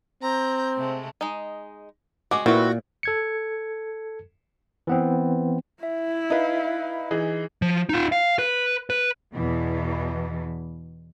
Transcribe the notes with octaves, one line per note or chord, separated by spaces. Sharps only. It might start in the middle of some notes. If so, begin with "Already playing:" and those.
C4 A#5 G6
C3 G#3 A3
G#3 D#4
G#3 F#4 D6
A#2 C4 E4 F#4 B4
A4 G#6 C#7
E3 B3 C4
E4 E5
D#4 B4 E5 F5
E3 D#4 G#4
F3
D#4 F4
F5
B4
B4
E2 B2 E3